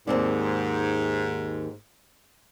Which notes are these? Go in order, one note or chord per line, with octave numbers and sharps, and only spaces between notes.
D#2 G#2 C4 D5